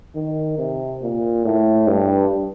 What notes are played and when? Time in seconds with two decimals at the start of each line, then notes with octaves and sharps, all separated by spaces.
0.15 D#3
0.58 C3
1.02 A#2
1.45 A2
1.87 G2